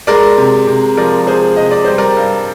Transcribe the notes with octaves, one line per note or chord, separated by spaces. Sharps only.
G#3 A#4 D5
C3
C3
F3 A#4 D5
G#3 G#4 C5
C3 D#5
D5
G3 C5
A#4 D5
G2